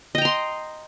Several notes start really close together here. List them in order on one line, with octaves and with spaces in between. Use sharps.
D#5 G5 A#5 C6